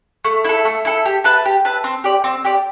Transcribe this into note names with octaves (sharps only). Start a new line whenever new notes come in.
A3
E4 A4
A3
E4 A4
G4
B4 E5 A5
G4
B4 E5 A5
C4
G4 D5
C4
G4 D5